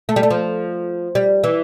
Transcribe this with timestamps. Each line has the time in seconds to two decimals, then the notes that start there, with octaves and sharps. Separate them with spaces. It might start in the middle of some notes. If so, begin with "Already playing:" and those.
0.09 A3
0.16 G3
0.23 A3
0.30 F3
1.15 G3
1.44 E3